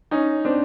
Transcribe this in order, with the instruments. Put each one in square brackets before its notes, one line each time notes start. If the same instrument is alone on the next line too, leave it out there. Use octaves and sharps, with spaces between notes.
[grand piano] C#4 D#4
C4 D4